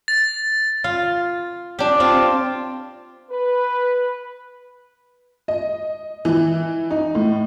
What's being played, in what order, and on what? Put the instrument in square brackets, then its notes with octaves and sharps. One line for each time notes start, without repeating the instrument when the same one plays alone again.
[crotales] A6
[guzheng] F4 F5
D4 G4
C4 F4
[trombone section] B4
[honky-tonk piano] D#5
E3
D#4
A2